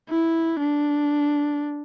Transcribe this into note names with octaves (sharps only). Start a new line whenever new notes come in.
E4
D4